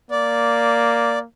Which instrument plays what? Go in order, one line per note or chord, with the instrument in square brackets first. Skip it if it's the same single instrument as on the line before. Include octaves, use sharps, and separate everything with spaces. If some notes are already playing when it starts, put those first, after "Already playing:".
[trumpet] A#3 [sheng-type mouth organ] D5